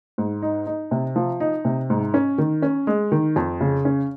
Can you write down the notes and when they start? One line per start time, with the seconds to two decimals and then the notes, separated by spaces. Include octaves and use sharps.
0.18 G#2
0.42 D#4
0.67 D#4
0.91 C3
1.16 F3
1.40 D#4
1.65 C3
1.90 G#2
2.14 C#4
2.38 D#3
2.62 C#4
2.87 G#3
3.12 D#3
3.36 F2
3.61 C#3
3.85 C#4